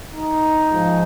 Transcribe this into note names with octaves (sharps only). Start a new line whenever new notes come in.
D#4
G#2 F3